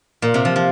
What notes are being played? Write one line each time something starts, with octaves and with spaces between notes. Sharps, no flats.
A#2
C3
F3
F3